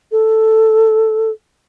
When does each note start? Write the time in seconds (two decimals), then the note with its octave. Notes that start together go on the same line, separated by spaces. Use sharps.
0.12 A4